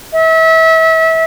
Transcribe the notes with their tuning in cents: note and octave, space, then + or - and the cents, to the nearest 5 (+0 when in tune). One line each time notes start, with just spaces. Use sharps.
E5 -30